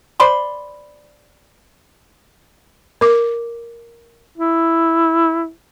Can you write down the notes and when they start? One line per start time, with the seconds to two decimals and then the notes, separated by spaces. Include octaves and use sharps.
0.20 C5 D5 B5 C6
3.01 A#4 D6
4.38 E4